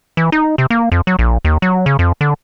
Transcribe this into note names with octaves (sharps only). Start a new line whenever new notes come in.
E3
D#4
C3
A#3
F2
F#3
A#1
D#2
F#3
C#3
F2
D3